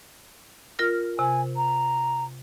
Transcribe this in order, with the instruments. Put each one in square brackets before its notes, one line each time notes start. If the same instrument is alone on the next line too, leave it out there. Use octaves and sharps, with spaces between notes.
[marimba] F4 A#4 F6
[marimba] C3 [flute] G#5
[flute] A#5